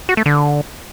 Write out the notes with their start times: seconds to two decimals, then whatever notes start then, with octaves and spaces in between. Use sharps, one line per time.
0.09 F#4
0.17 A3
0.26 D3